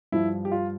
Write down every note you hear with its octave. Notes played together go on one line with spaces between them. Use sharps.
G2 F3 E4
G4
F4